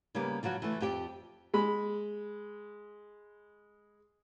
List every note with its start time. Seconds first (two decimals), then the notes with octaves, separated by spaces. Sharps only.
0.15 C#3 G3 A#3 B3
0.43 C#3 F3 F#3 F#4
0.62 E3 A3
0.81 F2 F3 G4 G5
1.54 G#3 B5